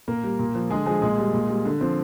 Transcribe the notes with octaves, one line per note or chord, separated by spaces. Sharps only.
A#2 A#3 A#4
G3
A#2
F3
D3 G#3 G#4
F3 G#3 G#4
A#2 G#3 G#4
G3
A#2
G3
D3
F3 C4 C5